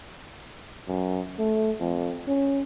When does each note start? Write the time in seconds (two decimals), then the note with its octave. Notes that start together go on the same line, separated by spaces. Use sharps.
0.88 F#2
1.39 A3
1.80 F2
2.27 C#4